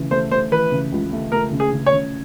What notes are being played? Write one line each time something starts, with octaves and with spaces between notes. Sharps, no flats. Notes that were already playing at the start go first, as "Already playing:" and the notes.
Already playing: C#2 C#3 E3 A3
A3 C5
A3 C5
E3 B4
C#3
C#2
A3
A3 A#4
C#3
G#4
C#3
C#5
C#3